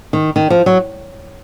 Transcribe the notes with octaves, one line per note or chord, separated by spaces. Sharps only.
D#3
D#3
F3
F#3